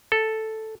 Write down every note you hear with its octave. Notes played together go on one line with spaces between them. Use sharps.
A4